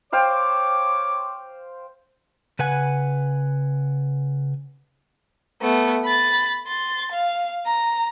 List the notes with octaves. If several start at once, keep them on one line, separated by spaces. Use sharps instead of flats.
C5 C#5 F5 G5 D6
C#3 B4 F#5 G#5
A3 B3
B5 A6
C6 A6
F5
A#5